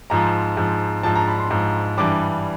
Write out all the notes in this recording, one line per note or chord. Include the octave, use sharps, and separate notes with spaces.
G#2 F3 A#5
G#2 F3
G#2 F3 A5
A#5
B5
C6
G#2 F3
G2 E3 G3 D6